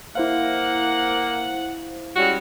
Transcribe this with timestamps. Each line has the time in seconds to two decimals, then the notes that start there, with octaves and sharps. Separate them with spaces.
0.15 A#3 E4 C5 F5 F#5
2.16 G3 G#3 C#4 F#4